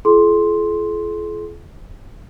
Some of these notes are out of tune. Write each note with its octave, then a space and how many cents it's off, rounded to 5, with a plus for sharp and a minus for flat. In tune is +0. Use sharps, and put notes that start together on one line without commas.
F4 -40 G#4 +45 C6 +5